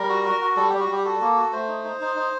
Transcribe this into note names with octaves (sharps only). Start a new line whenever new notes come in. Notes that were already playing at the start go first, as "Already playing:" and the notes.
Already playing: G3 A#4
F#4
F#4
F#4
G3 A4
G3 G4
F#4
G3 G4
F#4 A4
A#3
F#4
A3 C5
D#4
D#4
D#4
D#4